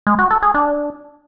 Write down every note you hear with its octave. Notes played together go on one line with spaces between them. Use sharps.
G#3
F#4
A4
G#4
D4